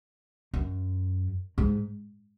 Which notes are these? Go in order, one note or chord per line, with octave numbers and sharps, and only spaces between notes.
F#2
G#2